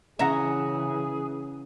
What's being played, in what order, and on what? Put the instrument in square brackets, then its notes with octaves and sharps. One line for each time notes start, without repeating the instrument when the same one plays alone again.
[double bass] C#3 E3 [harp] C#4 F#5 [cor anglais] G#4 [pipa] E5 A#5